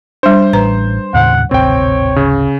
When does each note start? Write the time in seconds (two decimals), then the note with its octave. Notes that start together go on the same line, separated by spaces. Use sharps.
0.23 G3 D4 C5
0.53 A1 B4 A#5
1.14 D#2 A2 C#3 F#5
1.51 D1 G#1 C3 C4 C#5 G5
2.16 C#3